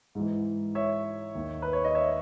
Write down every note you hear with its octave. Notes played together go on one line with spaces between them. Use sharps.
G#2 E3
C#5 E5
D#2 D#3
B4
C#5
D#5
C#5 E5